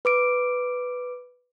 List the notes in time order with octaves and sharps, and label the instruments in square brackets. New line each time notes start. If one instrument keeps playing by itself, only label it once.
[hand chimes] B4 D6 D7